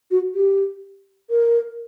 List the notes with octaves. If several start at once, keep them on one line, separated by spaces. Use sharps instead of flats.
F#4
G4
A#4